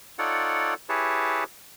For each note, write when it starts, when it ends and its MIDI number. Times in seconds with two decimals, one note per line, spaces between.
0.19 0.74 63
0.19 0.74 65
0.19 0.74 69
0.19 0.74 73
0.19 0.74 74
0.19 0.74 78
0.89 1.44 64
0.89 1.44 67
0.89 1.44 68
0.89 1.44 71
0.89 1.44 73
0.89 1.44 81